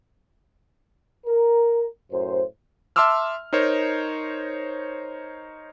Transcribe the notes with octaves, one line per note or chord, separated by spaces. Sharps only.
A#4
F#2 A2 C5
E5 A5 C6 D6 E6 F6
D#4 A#4 C5 C#5